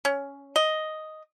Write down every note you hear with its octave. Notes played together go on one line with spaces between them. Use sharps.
C#4
D#5